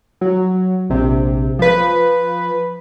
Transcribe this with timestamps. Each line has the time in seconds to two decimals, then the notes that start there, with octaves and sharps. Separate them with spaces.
0.21 F#3
0.90 A#1 C3
1.59 F3 B4